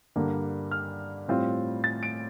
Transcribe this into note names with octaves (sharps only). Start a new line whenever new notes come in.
G2 D3 G3 A#3
F6
A2 G3 C4 F4
A6
D7